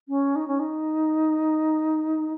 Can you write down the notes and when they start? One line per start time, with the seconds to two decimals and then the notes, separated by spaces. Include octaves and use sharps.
0.08 C#4
0.36 D#4
0.48 C#4
0.60 D#4